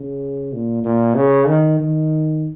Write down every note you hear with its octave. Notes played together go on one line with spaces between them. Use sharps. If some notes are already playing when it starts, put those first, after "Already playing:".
Already playing: C#3
A#2
A#2
C#3
D#3
D#3